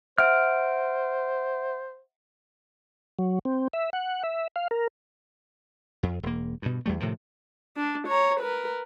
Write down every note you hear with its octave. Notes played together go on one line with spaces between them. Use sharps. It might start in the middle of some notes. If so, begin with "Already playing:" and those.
C5 E5 F#5 F6 D7
F#3
C4
E5
F#5
E5
F5
A#4
F2
E1 A#3
G2 B2
E2 G3 A3
A2 C3 D#3 F3
D4
C#5 A#5
A#4 B4